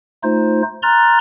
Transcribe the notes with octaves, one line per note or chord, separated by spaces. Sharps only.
A3 D#4 F4 C5
A#5 C6 F6 F#6 A6